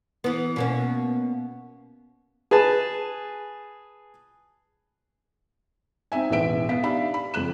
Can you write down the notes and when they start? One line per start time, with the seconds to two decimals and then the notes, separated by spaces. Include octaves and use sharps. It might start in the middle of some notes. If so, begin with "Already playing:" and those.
0.24 E3 B3
0.56 B2 A#3 C#4
2.51 G#4 B4 A5
6.12 C4 D#4 E5 G#5
6.30 E1 A1 E3 B4 E5 D7
6.69 B3 F5 B6
6.83 D4 D#4 G4 E5 F5 B5
7.14 B5
7.34 F#1 F2 F#6 E7